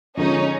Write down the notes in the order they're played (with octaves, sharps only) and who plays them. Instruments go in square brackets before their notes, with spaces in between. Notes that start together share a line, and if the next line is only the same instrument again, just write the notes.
[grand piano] D3 F3 G#3 B3 [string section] C#4 D#4